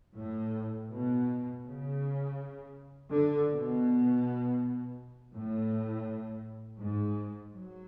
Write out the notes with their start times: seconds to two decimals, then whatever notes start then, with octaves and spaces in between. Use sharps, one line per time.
0.17 A2
0.91 B2
1.65 C#3
3.11 D3
3.49 B2
5.33 A2
6.80 G#2
7.54 F#3